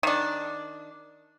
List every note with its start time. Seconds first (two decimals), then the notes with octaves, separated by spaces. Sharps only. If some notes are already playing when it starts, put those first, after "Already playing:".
0.03 D#3 D4